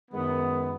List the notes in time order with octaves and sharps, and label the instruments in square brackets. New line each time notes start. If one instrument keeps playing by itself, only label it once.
[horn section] F#2 D#3 G#3 B3